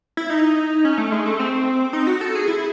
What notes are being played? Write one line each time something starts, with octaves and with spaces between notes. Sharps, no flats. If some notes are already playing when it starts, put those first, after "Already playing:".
E4
D#4
C#4
A3
G#3
A3
C4
D#4
F#4
A4
G#4
E4